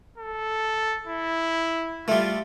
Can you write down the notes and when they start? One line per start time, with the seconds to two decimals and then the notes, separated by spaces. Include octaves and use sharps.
0.18 A4
1.08 E4
2.08 G3 A3 F4